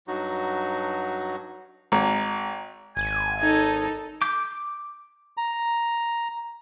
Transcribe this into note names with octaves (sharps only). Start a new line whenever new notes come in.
G2 F#3 D#4 F#4
G#1 A#5
G#1 G#5
D#4 A4
D6 G6
A#5